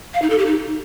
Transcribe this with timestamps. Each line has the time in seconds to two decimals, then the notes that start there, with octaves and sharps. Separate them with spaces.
0.14 F5
0.22 D#4
0.30 A4
0.38 G4
0.46 D#4